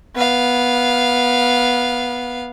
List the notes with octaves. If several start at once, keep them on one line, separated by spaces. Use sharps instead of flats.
B3 F5